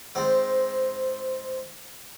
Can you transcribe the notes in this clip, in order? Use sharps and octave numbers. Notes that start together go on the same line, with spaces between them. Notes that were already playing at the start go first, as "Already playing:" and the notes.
G#2 C4